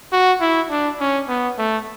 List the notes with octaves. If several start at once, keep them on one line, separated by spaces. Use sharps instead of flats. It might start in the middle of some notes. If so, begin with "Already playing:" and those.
F#4
E4
D4
C#4
B3
A3